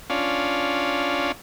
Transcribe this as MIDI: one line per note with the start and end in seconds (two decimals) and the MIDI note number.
0.10 1.32 61
0.10 1.32 62
0.10 1.32 65